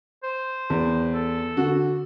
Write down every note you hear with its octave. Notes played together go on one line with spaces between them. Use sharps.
C5
E2
A4
D3 F#4